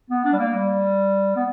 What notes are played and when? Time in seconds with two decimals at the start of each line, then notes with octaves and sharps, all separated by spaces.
0.10 B3
0.25 D4
0.33 G3
0.39 A#3
0.55 G3
1.36 B3